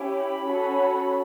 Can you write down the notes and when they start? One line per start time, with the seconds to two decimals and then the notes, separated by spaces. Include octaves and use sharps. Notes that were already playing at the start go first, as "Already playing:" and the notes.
Already playing: C#4 E4 G4
0.12 B5
0.46 C#4 F#4 A4